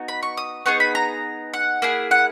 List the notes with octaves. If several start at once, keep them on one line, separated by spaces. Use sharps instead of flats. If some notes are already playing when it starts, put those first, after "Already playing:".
Already playing: B3 D#4 F#4
B5
C#6
D#6
B3 D#4 G#4 C#6
B5
A#5
F#5
A#3 E4 G#4
F#5